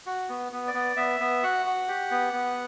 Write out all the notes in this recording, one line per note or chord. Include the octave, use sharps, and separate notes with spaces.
F#4
B3
B3
D5
B3
B3 E5
B3
F#4 F#5
F#4
G4
B3
B3